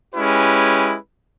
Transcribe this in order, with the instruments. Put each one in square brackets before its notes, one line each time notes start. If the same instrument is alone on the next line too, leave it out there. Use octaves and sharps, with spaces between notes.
[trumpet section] G#3 C#4 E4 G4 B4